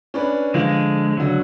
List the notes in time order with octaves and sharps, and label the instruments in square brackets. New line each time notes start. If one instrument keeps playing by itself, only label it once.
[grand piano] C#4 D4 B4
[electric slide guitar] D3 G#3 [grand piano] F3 F5
[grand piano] C#2 D3 [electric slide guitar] F#3